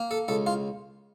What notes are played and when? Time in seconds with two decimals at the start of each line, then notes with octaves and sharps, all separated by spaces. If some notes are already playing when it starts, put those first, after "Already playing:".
Already playing: A#3
0.11 A4
0.28 C#2 A4
0.47 F4